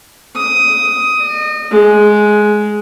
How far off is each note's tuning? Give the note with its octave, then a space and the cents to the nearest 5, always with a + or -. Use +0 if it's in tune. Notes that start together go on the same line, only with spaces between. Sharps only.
D#6 +15
D#5 -30
G#3 +10